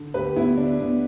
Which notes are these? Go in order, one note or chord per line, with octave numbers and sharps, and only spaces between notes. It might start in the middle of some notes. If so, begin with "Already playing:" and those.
Already playing: D3
D2 G4 B4
D2 B3 E4
D3 D4
D2 B3